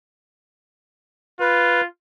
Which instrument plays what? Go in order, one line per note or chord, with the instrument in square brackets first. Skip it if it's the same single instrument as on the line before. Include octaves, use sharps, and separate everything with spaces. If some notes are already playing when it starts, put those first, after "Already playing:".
[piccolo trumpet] F4 [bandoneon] B4